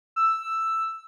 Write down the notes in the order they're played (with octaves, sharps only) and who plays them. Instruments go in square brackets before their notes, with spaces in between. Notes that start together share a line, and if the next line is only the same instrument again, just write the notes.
[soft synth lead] E6